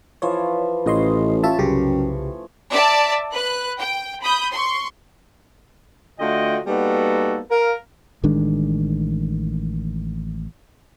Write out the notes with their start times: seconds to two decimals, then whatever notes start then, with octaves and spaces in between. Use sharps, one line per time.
0.22 E3 F3 C#5 E5
0.86 A1 A2 A3 C#4 D#5 C6
1.43 F4 C#5 E5 A5
1.58 C2 F#2 C#3 G4
2.70 D5 E5 A5
3.33 B4 F#6
3.78 G5
4.22 B5 D#6 G6
4.52 C6 C#6
6.19 D3 A3 F4 F#4 D#5 G5
6.67 G3 A#3 B3 D#4 F#4 A4
7.50 A#4 F5
8.23 A1 D#3 G#3 D4